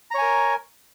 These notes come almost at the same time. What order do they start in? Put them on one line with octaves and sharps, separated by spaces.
A#5 C#5 G#5 A#4